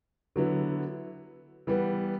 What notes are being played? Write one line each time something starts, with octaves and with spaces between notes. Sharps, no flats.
D3 F#3 B3 E4
E3 G3 B3